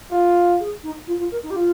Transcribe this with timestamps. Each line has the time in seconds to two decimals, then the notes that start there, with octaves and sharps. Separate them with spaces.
0.11 F4
0.60 G#4
0.83 D#4
1.07 F4
1.19 F4
1.32 A#4
1.43 D#4
1.51 G4
1.56 F4